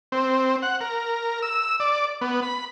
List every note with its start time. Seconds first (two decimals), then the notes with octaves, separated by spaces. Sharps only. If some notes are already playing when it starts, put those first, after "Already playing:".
0.12 C4
0.62 F#5
0.81 A#4
1.42 E6
1.80 D5
2.21 B3
2.42 B5